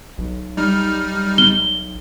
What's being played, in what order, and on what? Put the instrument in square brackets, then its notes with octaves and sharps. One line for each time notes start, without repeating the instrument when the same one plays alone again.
[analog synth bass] B1
[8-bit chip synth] G3 D#4 F6
[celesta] G7